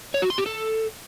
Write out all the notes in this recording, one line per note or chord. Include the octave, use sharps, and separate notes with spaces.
C#5
F#4
C6
G4
A4